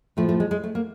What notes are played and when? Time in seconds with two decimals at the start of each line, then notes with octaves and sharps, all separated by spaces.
0.17 A2 F3 A3
0.29 A3
0.40 G#3
0.51 G#3
0.64 A3
0.75 A#3